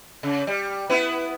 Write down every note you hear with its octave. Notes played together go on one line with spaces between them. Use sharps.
C#3
G3
B3 E4 B4